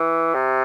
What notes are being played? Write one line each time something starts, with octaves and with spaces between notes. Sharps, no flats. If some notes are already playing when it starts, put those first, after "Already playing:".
Already playing: E3
C3